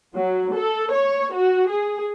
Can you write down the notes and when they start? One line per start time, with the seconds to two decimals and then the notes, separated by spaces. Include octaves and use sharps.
0.15 F#3
0.54 A4
0.91 C#5
1.34 F#4
1.69 G#4